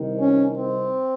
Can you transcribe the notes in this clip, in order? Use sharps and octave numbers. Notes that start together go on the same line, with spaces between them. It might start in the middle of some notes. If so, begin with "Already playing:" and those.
Already playing: C2 C3 D#3
C#4
C4